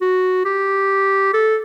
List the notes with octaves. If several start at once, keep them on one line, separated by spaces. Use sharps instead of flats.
F#4
G4
A4